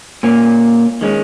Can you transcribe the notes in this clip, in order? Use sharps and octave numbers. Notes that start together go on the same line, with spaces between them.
A#2 A#3 C#4
D#3 G#3 C#4